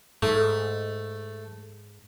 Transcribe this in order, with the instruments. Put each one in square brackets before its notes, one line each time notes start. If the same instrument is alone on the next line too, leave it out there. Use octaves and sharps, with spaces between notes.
[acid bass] G#2 [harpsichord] A3